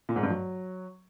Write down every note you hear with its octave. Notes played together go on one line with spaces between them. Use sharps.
A#2
G#2
G2
F#3